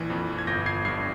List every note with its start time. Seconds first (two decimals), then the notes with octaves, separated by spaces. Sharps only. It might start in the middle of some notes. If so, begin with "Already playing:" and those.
Already playing: A#1 E3
0.10 F2
0.39 G#6
0.47 G1 G6 A#6
0.66 G#6 C7
0.85 G2 G#6 C7